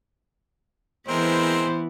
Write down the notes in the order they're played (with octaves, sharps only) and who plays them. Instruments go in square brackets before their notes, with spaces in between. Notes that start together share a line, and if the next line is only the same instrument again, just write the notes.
[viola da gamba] E3 B3 E4 [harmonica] G#3 C4 A#4 [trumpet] C5